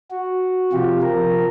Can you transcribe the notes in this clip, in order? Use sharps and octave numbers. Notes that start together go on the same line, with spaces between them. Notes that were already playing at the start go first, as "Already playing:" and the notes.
F#4
C3 F3 F4 G4
F3 A#4